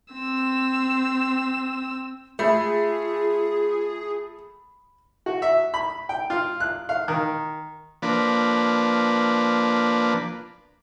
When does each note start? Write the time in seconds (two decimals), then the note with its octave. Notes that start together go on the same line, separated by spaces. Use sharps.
0.13 C4 E6
2.39 A3 F4 G#4 B5
5.26 F#4
5.42 E5
5.74 B5
6.09 G5
6.30 F4
6.60 F#6
6.89 F5
7.08 D#3
8.02 F3 A#3 D4 B4